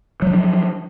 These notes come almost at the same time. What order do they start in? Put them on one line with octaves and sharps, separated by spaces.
F#3 F3 D4